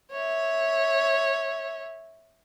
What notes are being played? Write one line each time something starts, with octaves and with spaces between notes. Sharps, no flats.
C#5 E5